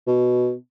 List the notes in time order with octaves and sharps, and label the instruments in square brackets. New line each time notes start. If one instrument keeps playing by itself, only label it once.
[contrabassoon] B2